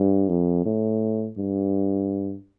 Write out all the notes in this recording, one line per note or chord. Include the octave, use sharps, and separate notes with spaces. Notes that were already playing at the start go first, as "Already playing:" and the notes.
Already playing: G2
F2
A2
G2